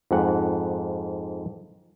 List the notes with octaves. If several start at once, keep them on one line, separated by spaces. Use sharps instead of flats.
F2 G#2 F#5